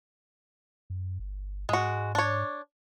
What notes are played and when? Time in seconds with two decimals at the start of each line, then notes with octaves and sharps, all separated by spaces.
0.90 F#2
1.19 G1
1.69 G#2 G#3 F#4
2.15 D4 C#5